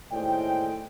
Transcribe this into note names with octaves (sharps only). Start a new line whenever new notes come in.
D#2 A2 G#3 C5 D5 G5